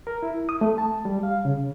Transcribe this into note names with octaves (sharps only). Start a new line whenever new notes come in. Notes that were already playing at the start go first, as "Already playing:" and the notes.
A#4
E4
D#6
A3
A5
G3
F5
C#3